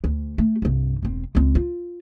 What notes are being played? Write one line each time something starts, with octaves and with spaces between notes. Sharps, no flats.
D2
A3
C2 G2
E1 C4
C#2 C4
F4